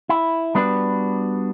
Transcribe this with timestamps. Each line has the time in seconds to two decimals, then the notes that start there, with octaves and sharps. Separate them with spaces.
0.09 E4
0.55 G3 B3 D4 F#4 B4